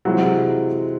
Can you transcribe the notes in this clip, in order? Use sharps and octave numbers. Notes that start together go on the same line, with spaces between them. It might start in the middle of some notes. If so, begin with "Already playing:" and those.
C3 E3 F#3 G#3 C4 F4